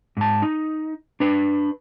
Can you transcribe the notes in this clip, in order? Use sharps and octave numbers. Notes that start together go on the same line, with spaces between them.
G#2 A5
D#4
D4 B4